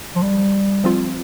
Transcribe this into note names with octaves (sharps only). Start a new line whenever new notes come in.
F3
G3
F3 C4 F4